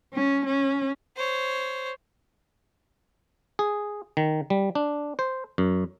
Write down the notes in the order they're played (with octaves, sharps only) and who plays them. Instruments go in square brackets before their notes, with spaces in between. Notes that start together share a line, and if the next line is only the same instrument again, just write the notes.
[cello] C#4
C#4
[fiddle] C5 C#5
[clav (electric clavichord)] G#4
D#3
G3
D4
C5
F#2